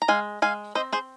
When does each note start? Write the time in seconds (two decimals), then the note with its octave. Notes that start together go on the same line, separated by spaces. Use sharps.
0.02 A#5
0.08 G#3 F5 G#5
0.42 G#3 F5 G#5
0.75 C4 C5 D#5
0.93 G#4 C5